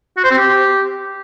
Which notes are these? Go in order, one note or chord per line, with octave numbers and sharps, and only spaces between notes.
F#4
C5
C4
G4